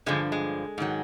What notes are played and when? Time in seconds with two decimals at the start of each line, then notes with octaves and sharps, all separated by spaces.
0.06 G2 D3 F3 G#3
0.32 G#3
0.78 G#2 D#3 F#3